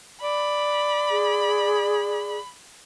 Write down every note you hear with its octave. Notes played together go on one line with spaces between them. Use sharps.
D5 B5
G#4